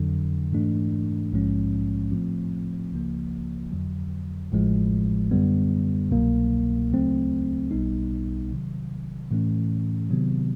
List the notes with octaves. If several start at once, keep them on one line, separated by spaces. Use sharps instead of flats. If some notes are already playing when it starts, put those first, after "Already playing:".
Already playing: F2 D3 F#3
G#2 E3 A3 D4
A#1 G#2 F3 G#3 C#4
A2 F3 A3 C4
C#2 C#3 F3 A#3
F2 D3 F#3
A1 A2 F3 G#3
F#2 D3 G3 B3
C2 B2 F#3 A#3
D2 C#3 F#3 A3 C4
B1 B2 G3 B3 D#4
C3 D#3 F#3
A2 E3 A3 C#4
C3 D#3 F#3 B3